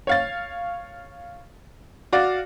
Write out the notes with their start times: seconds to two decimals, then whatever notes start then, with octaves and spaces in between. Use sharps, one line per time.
0.07 C#5 F5 A6
2.13 F#4 D5 F5